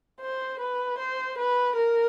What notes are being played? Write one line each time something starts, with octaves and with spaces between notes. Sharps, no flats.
C5
B4
C5
B4
A#4